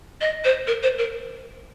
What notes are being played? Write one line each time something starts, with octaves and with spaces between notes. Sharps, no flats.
D#5
C5
A#4
C5
A#4